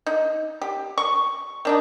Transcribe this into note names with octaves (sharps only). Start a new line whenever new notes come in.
D#4
G4
C#6
D#3 D4 D#4